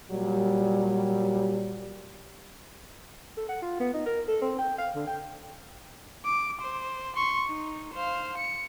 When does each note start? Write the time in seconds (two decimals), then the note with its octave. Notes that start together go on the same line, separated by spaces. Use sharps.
0.10 A#2 F#3 G3
3.37 A4
3.49 F#5
3.62 F4
3.80 B3
3.94 D#4
4.06 A#4
4.28 A4
4.42 C4
4.58 G5
4.78 F5
4.95 D3
5.07 G5
6.25 D6
6.61 C5
7.16 C6 C#6
7.49 D#4
7.94 C5 F5
8.37 C#7